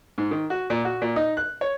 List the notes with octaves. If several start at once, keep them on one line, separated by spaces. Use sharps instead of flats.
G#2
D#3
F#4
A#2
F#4
A#2
D#4
F#6
C#5